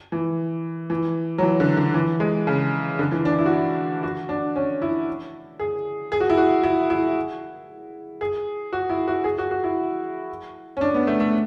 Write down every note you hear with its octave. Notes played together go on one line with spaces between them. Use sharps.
E3
E3
F#3
E3
D3
D3
E3
G#3
C#3
D3
E3
D4
E4
F#4
E4
F#4
D4
C#4
E4
G#4
G#4
F#4
E4
F#4
E4
E4
G#4
F#4
E4
F#4
G#4
F#4
F#4
E4
C#4
D4
B3
A3
A3